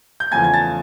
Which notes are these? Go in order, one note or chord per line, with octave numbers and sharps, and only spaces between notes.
G6
E2 C#3 F3 A3 G#5 G#6
G#6
A5 A6